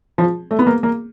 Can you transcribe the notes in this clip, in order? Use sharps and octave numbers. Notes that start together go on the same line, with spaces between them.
F3
A3
B3
A#3
A#3